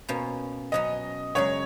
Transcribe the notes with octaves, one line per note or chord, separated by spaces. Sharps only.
B2 A#3 C#4
B2 F#3 C#4 D#5
F#2 C#3 G#3 C#5